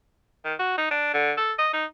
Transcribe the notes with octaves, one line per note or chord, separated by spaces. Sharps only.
D#3
F#4
D#4
D4
D3
A4
D#5
D#4